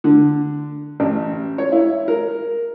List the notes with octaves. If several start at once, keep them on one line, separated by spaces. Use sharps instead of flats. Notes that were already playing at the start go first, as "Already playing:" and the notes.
D3
A1
C#5
E4
A#4